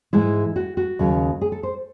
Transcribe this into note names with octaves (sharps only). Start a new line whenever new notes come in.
G#2 E3 G#3 E4
F#4
F#4
D#2 C#3 F#3
G#4
A4
C5